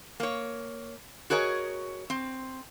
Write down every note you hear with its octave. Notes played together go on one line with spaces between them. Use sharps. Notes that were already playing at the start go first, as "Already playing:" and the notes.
A#3 C#5
F#4 G#4 A#4 C#5 D#5
C4